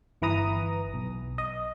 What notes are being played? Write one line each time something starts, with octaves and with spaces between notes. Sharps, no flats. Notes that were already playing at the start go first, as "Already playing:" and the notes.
G1 E3 B4 A#5 D#6
B1
D#5